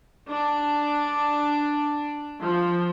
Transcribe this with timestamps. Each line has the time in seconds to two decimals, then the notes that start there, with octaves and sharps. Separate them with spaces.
0.29 D4
2.40 F3